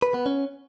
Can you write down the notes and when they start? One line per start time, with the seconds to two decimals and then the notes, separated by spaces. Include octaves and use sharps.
0.02 B4
0.14 B3
0.26 C#4